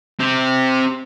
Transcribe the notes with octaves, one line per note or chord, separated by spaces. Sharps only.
C4 G4